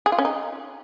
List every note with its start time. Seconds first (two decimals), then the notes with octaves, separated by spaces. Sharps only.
0.06 G#4
0.12 F4
0.18 C#4
0.25 D#4